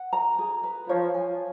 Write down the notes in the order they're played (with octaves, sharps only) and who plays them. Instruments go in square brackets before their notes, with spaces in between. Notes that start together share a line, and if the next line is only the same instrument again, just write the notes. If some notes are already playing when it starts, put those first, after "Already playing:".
Already playing: [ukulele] F#5
A#5
G#4
B4
[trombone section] F3 [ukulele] C#5
[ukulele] G#5